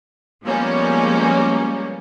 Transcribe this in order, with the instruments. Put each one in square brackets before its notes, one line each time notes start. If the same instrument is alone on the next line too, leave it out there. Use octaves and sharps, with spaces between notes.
[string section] F3 G3 G#3 A#3 B3 C#4